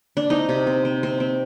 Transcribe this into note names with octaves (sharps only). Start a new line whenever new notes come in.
D4
C4 D#4
C3
C4
C4
C4
C4